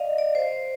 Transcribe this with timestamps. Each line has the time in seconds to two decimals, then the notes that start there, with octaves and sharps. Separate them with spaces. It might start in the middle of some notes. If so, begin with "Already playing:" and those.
Already playing: D5 D#5 F5
0.18 D5
0.35 C5